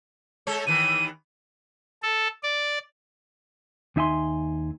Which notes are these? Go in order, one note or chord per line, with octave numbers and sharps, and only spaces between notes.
G#3 A4 C#5
D#2 D#3 E3 D#7
A4
D5
D#2 D#4 E5 G#5 C6